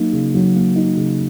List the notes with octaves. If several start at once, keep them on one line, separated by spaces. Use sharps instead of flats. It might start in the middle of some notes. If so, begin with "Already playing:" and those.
Already playing: F#3 A#3 D#4
C#3
F#3
A#3
D#4
C#3